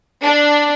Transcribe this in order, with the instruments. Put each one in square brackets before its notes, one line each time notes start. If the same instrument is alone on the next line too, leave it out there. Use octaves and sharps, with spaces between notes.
[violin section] D4